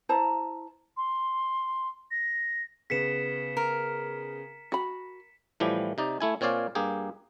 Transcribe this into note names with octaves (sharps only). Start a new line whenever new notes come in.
E4 C5 A5 A#5
C6
A#6
C#3 B3 B6 C#7 E7
A#4
F#4 B5
A2 E3 F3 G3 G4
C3 D#4 D5
A3 E4 G#5
A#2 C4 C#5 D5 F5 G#5
G2 A#3 G4 G#4